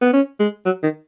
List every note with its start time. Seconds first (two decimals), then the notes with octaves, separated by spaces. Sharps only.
0.01 B3
0.13 C#4
0.40 G#3
0.65 F#3
0.83 D#3